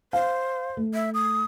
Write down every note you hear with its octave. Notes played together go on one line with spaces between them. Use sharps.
C5 F5
A3
E5
D#6